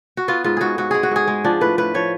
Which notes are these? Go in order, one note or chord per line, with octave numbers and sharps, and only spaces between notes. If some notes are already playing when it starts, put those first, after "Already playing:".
F#4
B3 F4
G#2 F4
G#2 F#4 G#4
G#2 F#4
G#3 G#4
F#4
G#2 G#4
G#3
F3 D4
A2 B4
A2 B4
F3 C#5